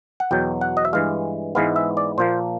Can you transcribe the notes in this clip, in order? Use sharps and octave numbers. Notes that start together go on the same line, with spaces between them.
F#5
E2 B2 F#3 G5
F#5
D#5
E5
G2 E3 G#3 F5
G#2 E3 G#3 B3 F5
E5
D5
A#2 F3 A#3 C5